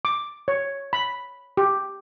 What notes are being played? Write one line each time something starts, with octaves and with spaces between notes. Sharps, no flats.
D6
C#5
B5
G4